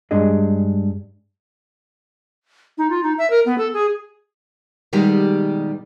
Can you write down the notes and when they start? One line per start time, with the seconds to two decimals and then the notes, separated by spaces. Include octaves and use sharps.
0.11 G2 G#3 D4 G#4 D#5
2.78 D#4
2.90 F4
3.03 D#4
3.18 E5
3.30 A#4
3.46 B3
3.58 A4
3.73 G#4
4.93 B2 D#3 G3 G#3 G4